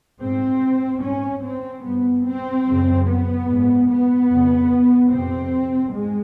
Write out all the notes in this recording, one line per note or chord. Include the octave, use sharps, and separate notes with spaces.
G#2 C4
G#2 C#4
C4
G2 B3
C4
F#2 C#3
B3
G#2
B3
F2 C#3
F2 C3 C4
G#2 G#3